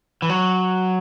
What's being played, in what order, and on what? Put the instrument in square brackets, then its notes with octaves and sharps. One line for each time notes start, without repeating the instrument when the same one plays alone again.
[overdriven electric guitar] E3
F#3